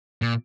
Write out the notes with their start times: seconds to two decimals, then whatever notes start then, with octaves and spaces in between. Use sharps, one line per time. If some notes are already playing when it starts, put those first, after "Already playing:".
0.22 A#2